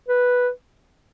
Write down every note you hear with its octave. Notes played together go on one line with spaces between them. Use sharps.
B4